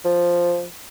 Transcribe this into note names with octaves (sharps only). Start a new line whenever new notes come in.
F3